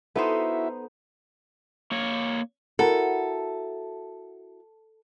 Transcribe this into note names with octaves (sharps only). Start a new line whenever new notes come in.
B3 D#4 E4 F#4 A4 C5 E5
A#3 C#5
E4 F#4 A4 A#4